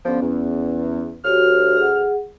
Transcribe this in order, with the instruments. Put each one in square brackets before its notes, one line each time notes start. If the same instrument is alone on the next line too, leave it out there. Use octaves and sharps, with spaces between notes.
[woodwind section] G2 D3 F3 [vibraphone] B3 C#4
[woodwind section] E2
[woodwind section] D2 F6 [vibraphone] F#4 G4 C#5
[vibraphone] G#4 F#5